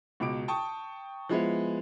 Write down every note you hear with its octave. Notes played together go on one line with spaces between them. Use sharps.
C#2 B2 D6 D7
G5 A5 C#6 D#6
F3 G#3 B3 E4